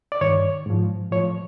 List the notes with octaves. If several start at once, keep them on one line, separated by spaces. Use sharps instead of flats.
D5
G2 D#3 C#5
G#2 F3
A2 F3 C#5